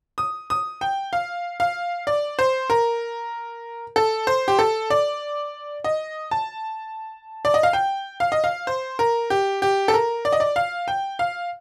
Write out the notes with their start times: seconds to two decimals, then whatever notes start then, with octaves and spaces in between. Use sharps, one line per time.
0.18 D#6
0.50 D#6
0.81 G5
1.13 F5
1.60 F5
2.07 D5
2.39 C5
2.70 A#4
3.96 A4
4.27 C5
4.48 G4
4.59 A4
4.90 D5
5.84 D#5
6.31 A5
7.45 D5
7.54 D#5
7.63 F5
7.73 G5
8.20 F5
8.32 D#5
8.44 F5
8.67 C5
8.99 A#4
9.30 G4
9.62 G4
9.88 A4
9.94 A#4
10.25 D5
10.33 D#5
10.40 D5
10.56 F5
10.88 G5
11.19 F5